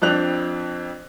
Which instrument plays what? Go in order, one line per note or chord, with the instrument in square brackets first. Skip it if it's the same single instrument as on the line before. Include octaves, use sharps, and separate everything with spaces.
[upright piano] F2 F3 C4 D4 F#6 F7